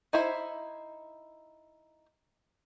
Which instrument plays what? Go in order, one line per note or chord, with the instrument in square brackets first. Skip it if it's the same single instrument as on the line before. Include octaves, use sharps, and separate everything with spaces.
[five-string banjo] D#4 E4 C5 E5